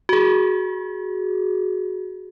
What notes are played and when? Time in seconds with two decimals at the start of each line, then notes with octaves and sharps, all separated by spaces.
0.09 F#4 G#4